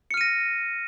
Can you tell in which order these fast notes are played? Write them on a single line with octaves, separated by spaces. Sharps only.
C#7 F6 D#7 A#6